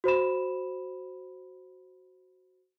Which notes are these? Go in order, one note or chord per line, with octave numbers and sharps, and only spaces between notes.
F#4 C5 B5 E7